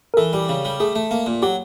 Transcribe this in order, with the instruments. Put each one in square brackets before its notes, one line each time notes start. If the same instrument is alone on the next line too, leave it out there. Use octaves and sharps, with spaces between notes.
[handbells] A#4
[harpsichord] E3 [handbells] A4
[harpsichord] G3
C#3
G3
[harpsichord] A3 [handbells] G#4
[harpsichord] A3
A#3
A#2
[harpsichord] F#3 [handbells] G4